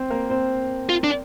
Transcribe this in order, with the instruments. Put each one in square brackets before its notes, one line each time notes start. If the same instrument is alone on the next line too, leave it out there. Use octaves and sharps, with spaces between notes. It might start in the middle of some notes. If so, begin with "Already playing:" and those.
Already playing: [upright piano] C4 C5
A#3 A#4
C4 C5
[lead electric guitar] F4
D4